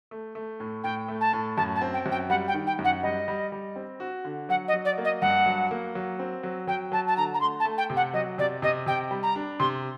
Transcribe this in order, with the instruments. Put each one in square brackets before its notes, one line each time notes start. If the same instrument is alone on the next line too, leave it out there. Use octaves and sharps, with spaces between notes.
[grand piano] A3
A3
A2
[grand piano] A2 [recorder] G5
[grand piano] A3
[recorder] A5
[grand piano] A2
[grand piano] F#2 [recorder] A5
[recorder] A5
[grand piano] C4
[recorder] G5
[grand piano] F#2
[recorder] G5
[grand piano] G3 [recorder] F#5
[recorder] G5
[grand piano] D#3
[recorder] G5
[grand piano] F#2
[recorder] F#5
[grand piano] G3 [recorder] D#5
[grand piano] G3
G3
C4
F#4
D3
[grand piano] F#3 [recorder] F#5
[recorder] D#5
[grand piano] F#3
[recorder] D5
[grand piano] A#3
[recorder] D#5
[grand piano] G2 [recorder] F#5
[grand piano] F#3
A#3
F#3
C4
F#3
[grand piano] F#3 [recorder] G5
[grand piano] F#3 [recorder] A5
[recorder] A5
[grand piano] D3 [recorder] A#5
[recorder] A#5
[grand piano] A3 [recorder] C6
[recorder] A5
[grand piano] A3
[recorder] G5
[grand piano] C3
[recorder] F#5
[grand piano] F#3 [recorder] D#5
[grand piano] C3 [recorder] D5
[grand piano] C3 [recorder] D#5
[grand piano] C3 [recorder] G5
[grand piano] G3
[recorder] A#5
[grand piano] D4
[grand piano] C3 [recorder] C6